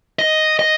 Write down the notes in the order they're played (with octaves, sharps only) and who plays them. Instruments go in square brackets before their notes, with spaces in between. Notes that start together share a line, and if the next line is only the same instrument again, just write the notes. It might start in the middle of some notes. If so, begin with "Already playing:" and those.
[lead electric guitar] D#5
D#5